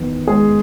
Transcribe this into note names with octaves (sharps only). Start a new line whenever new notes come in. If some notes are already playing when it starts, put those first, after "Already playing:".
Already playing: E2 D#3 B3
G#3 G#4